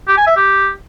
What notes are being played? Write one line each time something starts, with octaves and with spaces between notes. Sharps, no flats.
G4
G#5
E5
G4